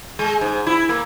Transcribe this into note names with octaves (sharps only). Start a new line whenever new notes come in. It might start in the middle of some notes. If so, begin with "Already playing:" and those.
G#3
G#2
E4
A#3